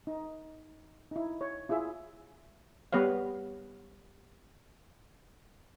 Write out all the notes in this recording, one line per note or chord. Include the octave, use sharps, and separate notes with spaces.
D#4
D#4 E4
C#5
E4 F4 G#4 E5
G3 B3 B4 C#5 F5